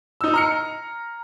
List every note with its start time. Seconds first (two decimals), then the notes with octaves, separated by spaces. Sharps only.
0.21 D#4 E6
0.34 A#5 F6 C#7